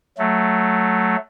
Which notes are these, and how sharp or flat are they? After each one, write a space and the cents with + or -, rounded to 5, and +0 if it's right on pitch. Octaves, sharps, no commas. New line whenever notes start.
F#3 +0 A3 +0